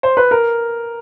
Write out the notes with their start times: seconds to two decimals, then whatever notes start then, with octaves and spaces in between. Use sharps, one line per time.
0.03 C5
0.17 B4
0.31 A#4